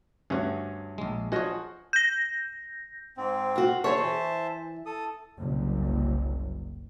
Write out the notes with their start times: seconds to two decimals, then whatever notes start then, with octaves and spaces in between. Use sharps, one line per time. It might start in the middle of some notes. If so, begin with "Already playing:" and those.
0.30 D2 G2 C#4 F#4
0.98 A#1 G#3
1.32 F3 F#4 G#4 C#5 D#5
1.93 G6 A#6
3.18 G#2 C4
3.56 F4 F#4
3.84 G#4 C5 C#5 E5 A5
3.98 E3
4.86 A4 D#6
5.39 F#1 C2